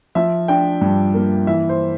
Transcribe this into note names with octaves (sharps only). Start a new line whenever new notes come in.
F3 E5
D4 G5
G2
A#3
E3 E5
C5